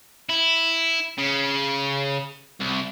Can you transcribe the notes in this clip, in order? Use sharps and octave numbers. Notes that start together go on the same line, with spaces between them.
E4
C#3
C2